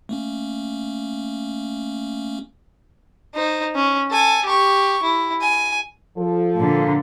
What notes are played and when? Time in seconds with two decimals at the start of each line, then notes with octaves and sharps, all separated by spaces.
0.09 A3 A#3 C#4
3.34 D#4 C5
3.76 C#4
4.11 A4 G#5
4.45 G4 C#6
5.03 E4
5.41 G#5
6.17 F3 A4
6.57 A#2 D3